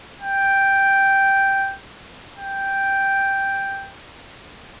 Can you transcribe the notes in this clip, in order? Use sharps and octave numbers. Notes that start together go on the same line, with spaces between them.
G5
G5